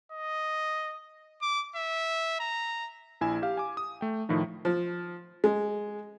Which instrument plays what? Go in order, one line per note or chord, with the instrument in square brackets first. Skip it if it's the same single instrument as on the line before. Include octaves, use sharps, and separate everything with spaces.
[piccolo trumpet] D#5
D6
E5
A#5
[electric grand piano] A#1 E4 G#5 E7
G4 F5
G#5 D6
D#6
A3 G5
A2 D#3 F3 D#4
[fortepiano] F3
G#3